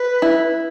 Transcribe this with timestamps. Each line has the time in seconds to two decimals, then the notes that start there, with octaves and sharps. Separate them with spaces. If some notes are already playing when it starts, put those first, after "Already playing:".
Already playing: B4
0.22 E4